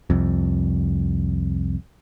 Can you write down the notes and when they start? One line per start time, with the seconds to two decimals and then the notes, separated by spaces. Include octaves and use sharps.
0.10 C2 F2